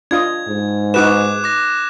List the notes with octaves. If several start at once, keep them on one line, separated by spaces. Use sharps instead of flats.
D4 F4 D#5 G#6
G#2
D#4 F#4 B4 D6 F#6 E7
D6 A#6